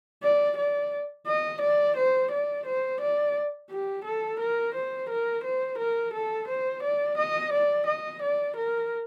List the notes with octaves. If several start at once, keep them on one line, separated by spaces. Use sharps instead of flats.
D5
D5
D#5
D5
C5
D5
C5
D5
G4
A4
A#4
C5
A#4
C5
A#4
A4
C5
D5
D#5
D5
D#5
D5
A#4